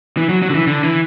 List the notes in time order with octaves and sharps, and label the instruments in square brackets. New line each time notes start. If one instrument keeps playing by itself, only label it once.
[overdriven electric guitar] E3
F#3
F#3
D3
E3
D3
E3